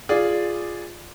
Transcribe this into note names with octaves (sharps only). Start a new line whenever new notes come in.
F4 G#4 D5